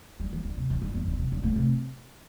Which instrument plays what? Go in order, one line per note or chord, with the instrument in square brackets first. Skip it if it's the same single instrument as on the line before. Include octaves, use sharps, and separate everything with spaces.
[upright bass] G3
E3
D3
C3
E3
G2
E2
D3
C3
G2
A2
C3